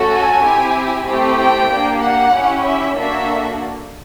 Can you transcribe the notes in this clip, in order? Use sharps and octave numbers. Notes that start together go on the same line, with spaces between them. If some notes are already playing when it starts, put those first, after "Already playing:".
Already playing: A3 C#4 F#4 A4
G#5
C4 E4 G4
A3 C4 E4 G4
G5
A#3 D4 G4
F#5
C#4 E4 G4
E5
A#3 D4 F#4 A4 E5